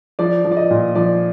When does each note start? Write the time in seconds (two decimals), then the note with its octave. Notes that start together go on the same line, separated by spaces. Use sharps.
0.19 F3 D5
0.45 F3
0.52 D5
0.57 D#5
0.71 A#2
0.95 F3 D5